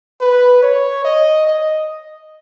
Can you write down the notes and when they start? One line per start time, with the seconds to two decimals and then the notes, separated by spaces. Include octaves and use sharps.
0.21 B4
0.62 C#5
1.05 D#5
1.47 D#5